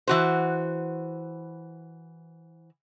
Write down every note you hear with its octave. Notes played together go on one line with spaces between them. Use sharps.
E3 F#4 C5